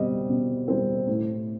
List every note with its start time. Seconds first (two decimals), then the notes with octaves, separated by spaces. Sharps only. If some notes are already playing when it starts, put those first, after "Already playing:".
Already playing: B2 G3 C4 D#5
0.29 B2
0.68 G3 C4
1.07 A2